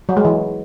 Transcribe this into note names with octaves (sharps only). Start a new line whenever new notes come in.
F#3
G#3
E3